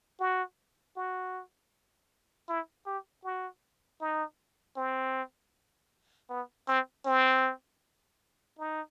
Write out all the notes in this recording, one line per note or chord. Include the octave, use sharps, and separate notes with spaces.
F#4
F#4
E4
G4
F#4
D#4
C4
B3
C4
C4
D#4